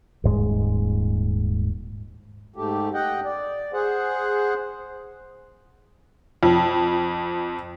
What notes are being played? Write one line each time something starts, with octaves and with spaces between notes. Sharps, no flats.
D#1 G#2 G#3
G#2 A3 G4
D#5 F#5 G5
D5
G#4 C5 F#5
F2